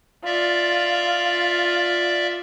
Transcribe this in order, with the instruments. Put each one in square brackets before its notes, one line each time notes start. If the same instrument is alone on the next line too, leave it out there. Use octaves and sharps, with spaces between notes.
[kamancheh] F4 [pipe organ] D5 E5